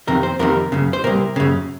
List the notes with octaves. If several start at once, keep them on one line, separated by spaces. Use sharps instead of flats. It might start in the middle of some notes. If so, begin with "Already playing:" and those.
F2 C3 D#3 A#4
C5
F2 C3 D#3 A#4
F#2 C#3
C5
C2 A#2 A#4
F#2 C#3